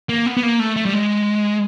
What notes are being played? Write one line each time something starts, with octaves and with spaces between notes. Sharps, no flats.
A#3
B3
B3
A#3
A3
A3
G3
G#3